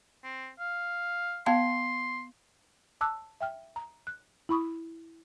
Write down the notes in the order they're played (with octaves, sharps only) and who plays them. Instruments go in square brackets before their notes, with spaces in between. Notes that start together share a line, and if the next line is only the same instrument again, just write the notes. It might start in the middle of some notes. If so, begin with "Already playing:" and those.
[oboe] C4
F5
[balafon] B3 F5 A5 [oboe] C6
[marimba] A5 D6 E6 F#6
E5 G5 F6
A#5
F#6
E4 B5 C#6 D#6